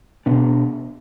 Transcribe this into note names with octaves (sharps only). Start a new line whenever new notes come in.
B2 B3 D4